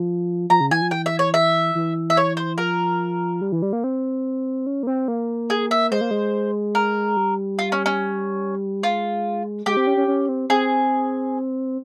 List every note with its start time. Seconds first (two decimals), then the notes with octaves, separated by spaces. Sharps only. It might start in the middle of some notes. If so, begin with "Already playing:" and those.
Already playing: F3
0.50 F3 A#5
0.60 C#3
0.71 E3 G#5
0.81 F3
0.91 E3 G5
1.06 E5
1.19 C#5
1.34 E5
1.75 E3
2.10 E5
2.17 C#5
2.37 C5
2.58 F3 A#4
3.41 G3
3.52 E3
3.62 G3
3.73 A#3
3.84 C4
4.67 C#4
4.83 A#3
4.87 C4
5.08 A#3
5.50 G#4
5.71 E5
5.91 G#3 C5
6.01 A#3
6.11 G#3
6.75 A#4
7.17 G3
7.59 F4
7.72 C#4
7.86 C#4
8.83 G#3 F4
9.66 G#3 G4
9.77 C4
9.87 C#4
9.97 C#4
10.08 C#4
10.29 C4
10.50 C4 G#4